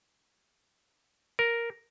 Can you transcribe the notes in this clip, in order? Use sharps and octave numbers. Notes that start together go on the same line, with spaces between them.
A#4